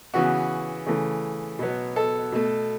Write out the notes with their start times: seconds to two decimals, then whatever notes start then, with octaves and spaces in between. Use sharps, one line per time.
0.14 C#3 E3 B3 F#4
0.86 C#3 E3 A3
1.59 B2 F#3 B3
1.96 A4
2.32 B2 A3